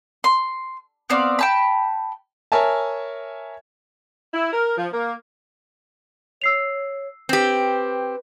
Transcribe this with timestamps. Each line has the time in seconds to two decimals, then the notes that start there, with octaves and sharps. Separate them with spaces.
0.24 C6
1.10 B3 C4 D5 F5
1.39 G5 A5 B5
2.52 A#4 C#5 E5 G#5 A5
4.34 E4
4.53 A#4
4.77 F3
4.93 A#3
6.42 C#5 E6 C7 F7
7.29 C4 G4 B4